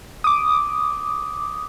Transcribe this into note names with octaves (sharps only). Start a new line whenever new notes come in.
D6 D#6